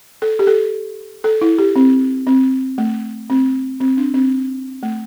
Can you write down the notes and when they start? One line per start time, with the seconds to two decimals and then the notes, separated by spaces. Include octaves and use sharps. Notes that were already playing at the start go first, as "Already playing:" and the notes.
0.22 A4
0.39 G4
0.47 A4
1.24 A4
1.41 E4
1.58 G4
1.76 C4
2.27 C4
2.78 A3
3.30 C4
3.80 C4
3.97 D4
4.14 C4
4.83 A3